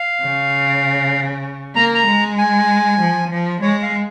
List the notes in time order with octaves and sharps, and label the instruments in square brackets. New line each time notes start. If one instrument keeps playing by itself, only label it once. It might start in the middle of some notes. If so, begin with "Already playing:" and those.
Already playing: [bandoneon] F5
[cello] C#3
[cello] A#3 [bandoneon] A#5
[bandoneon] A#5
[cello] G#3
[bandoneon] G#5
[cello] F3
F3
[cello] G#3 [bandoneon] C#5
[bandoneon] F5